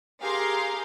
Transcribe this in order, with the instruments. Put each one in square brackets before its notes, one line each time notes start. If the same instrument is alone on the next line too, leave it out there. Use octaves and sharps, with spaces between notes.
[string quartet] G4 G#4 A#4 [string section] F5 A#5 C6